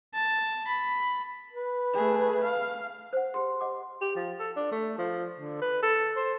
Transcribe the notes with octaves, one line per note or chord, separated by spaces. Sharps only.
A5
B5
B4
A3 G#4
F5
C5 F#5
G4 G#4 C6
D#5 F#5 D6
G4
F3
A4
D4
A3
F3
D3
B4
A4
C5